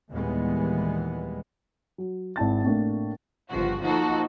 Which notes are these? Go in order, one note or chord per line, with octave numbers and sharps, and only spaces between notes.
D#2 A#2 E3 G3 G#3 B3
F#3
G#1 E4 A5 A6
A2 C3 A3 A#3 D4
G1 C#3 F3 F#4
F3 A#3 D#4 F#4 A4